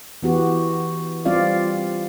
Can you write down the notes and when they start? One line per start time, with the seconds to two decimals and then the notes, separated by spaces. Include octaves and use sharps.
0.23 E3 B3 F#4 G4
1.25 G3 C4 F4 D5 F5